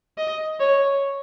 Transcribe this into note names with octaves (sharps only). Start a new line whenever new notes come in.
D#5
C#5